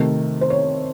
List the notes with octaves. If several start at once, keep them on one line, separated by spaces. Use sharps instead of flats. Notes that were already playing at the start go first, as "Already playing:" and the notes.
Already playing: C3 D#3 A3
C5
C#5